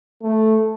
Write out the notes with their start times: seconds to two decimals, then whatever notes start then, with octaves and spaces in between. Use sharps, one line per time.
0.22 A3